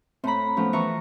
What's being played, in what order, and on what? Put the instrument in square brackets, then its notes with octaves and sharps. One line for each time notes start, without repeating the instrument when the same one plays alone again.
[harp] A2 B5 [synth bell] C4 A#5
[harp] F3 B3 [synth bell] A3 C#4
[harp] E3 A#5 C#6